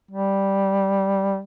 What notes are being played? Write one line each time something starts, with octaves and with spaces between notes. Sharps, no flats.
G3